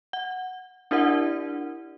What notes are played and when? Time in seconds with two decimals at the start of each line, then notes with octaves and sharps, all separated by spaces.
0.13 F#5
0.91 D4 E4 G4 A#4 D5 F#5